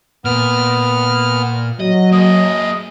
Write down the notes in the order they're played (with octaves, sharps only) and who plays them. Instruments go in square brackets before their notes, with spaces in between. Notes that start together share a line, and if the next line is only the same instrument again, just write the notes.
[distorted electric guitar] A#2 [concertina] B3 F6
[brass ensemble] F#3 [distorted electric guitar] D#5
[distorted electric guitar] A#3 G#4 [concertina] D#5